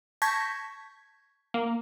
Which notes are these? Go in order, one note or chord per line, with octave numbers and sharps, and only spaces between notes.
A5 C#6 G6 G#6 A#6 B6
A#3